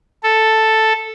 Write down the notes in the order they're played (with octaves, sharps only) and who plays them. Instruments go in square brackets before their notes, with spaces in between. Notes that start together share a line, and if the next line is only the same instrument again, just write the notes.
[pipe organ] A4